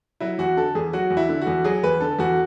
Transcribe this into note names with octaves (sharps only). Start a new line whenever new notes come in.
F#3 E4
E2 F#4
D3 A4
E2 G#4
F#3 F#4
E2
E4
D3
F#4
E2
F#3 G#4
E2 B4
D3 A4
E2 F#4